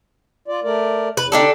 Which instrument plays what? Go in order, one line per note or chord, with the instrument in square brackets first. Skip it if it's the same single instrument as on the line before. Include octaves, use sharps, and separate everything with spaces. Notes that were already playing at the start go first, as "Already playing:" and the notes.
[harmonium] F4 D5
A3 A#4 D5
[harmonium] E2 [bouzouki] B4
[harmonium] D3 D#4 D5 [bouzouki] D4 G4 A4